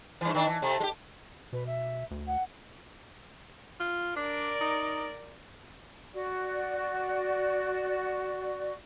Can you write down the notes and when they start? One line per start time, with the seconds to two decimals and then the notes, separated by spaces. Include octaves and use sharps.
0.21 G2 E3
0.34 D#3 D4
0.47 E3
0.62 C3 A3
0.80 G#3 G4
1.53 B2 B4
1.66 E5
2.11 D2
2.27 F#5
3.80 F4
4.16 D4 A#4 D5
4.61 D#4
6.14 F#4 D5